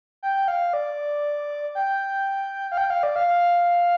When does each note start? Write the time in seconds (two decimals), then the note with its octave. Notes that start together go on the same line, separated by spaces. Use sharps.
0.23 G5
0.48 F5
0.73 D5
1.75 G5
2.72 F5
2.77 G5
2.90 F5
3.03 D5
3.16 F5
3.28 F5